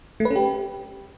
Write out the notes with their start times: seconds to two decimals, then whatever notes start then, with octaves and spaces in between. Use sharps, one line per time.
0.20 A3
0.25 B4
0.30 C#4
0.36 G4